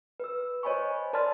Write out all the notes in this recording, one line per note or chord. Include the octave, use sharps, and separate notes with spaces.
B4 E6
C5 C#5 D#5 G#5 B5 C#6
A#4 D5 A5 C6 F6 A6